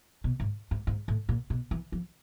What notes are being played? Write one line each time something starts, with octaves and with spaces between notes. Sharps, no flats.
B2
G#2
G#2
G#2
A2
A#2
B2
E3
F3